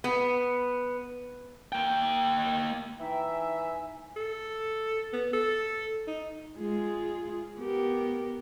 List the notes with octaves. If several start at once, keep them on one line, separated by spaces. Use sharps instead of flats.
B3
A#3 G5
E3 D#4 E5 G5
G#5
A4
B3
A4
D#4
G#3 F4 G#4
B3 G4 A#4